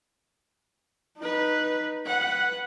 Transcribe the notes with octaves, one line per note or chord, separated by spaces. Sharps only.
D#4 B4
B4 F#5